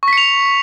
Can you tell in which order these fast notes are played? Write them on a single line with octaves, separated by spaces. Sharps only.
C#6 B6 C#7 F7